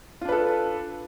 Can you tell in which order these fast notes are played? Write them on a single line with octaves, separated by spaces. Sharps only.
F4 D4 B4 A4